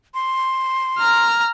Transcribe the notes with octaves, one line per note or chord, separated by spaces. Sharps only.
C6
A#5 F6